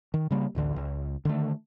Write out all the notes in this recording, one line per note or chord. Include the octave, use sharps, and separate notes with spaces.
D#3
C#3 G3 A#3
A1 D2 D3
C#2
D3 D#3 A3